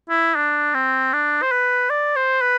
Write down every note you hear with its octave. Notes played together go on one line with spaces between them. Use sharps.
E4
D4
C4
D4
C5
B4
D5
C5
B4